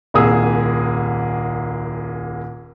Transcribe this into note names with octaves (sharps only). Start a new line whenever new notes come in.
D#1 C2 A#3 G#4 D#6 E6